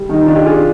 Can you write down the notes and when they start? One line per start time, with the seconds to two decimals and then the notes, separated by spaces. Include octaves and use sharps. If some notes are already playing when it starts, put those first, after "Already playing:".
Already playing: G3
0.09 D#3 D#4
0.25 D4 F4
0.35 G4
0.45 D4 F4 G#4